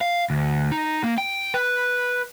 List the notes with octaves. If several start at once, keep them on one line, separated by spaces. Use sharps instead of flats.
F5
D2
D#4
A#3
G5
B4